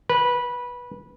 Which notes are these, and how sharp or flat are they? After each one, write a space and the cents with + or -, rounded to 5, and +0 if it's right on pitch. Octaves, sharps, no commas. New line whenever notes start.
B4 -15